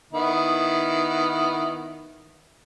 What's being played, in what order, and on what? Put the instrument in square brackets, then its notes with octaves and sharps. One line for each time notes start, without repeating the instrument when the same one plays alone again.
[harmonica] D#3 B3 E4